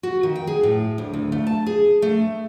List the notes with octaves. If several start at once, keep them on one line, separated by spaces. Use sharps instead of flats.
F#4
D#3
G5
G#4
A2
D2
D2
A3
A5
G#4
A3